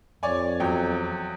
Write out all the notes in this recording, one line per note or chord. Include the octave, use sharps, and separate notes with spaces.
F2 C#5 D5 G#5
E2 F#3 G5